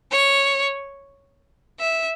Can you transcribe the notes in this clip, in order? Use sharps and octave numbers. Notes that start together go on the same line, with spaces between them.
C#5
E5